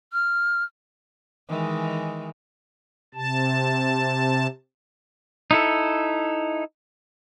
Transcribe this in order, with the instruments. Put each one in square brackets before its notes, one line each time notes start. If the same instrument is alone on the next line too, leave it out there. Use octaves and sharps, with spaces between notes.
[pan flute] F6
[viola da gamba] D#3 E3 G#3
[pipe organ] C3 A5
[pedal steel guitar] D#4 E4 A4